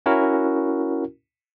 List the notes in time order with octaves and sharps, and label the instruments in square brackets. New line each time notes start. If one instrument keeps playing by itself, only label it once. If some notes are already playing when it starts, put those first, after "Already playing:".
[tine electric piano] C#4 E4 F#4 A#4